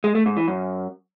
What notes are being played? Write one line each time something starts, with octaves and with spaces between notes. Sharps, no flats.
G#3
A3
G#2
E3
F#2